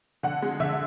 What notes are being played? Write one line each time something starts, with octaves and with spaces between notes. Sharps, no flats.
D3 F#5
G#3
D3 E5